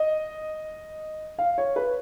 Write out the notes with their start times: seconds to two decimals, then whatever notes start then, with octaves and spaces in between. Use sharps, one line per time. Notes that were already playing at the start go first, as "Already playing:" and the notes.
Already playing: D#5
1.39 F5
1.58 C#5
1.76 B4